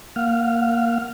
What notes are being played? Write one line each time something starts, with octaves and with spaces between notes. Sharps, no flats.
A#3 F5 F#5 F6